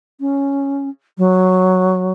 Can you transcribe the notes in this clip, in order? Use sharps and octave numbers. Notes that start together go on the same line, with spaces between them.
C#4
F#3